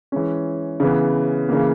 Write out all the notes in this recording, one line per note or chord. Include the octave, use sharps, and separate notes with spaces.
E3 G#3 C#4
C#3 E3 B3
C#3 E3 A#3